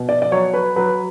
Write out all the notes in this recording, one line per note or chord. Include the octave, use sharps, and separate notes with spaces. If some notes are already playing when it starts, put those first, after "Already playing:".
Already playing: B2
D5
D5
F#3 C#5
B4
F#3 B4